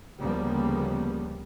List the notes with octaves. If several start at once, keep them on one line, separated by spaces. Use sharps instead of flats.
D2 C#3 F3 G3 A#3 B3